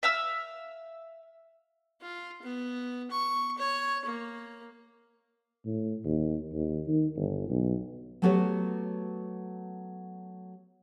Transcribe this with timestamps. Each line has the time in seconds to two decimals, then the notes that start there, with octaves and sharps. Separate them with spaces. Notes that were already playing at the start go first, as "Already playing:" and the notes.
0.03 E5 F5 E6
2.02 F4
2.42 B3
3.11 C#6
3.58 C#5
4.05 A#3
5.65 A2
6.05 D#2
6.53 D#2
6.88 D#3
7.16 G1
7.49 B1
8.22 F#3 A3 B3 F#4 G4 C#5